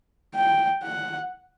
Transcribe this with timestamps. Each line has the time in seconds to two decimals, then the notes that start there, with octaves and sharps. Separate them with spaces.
0.35 G5
0.83 F#5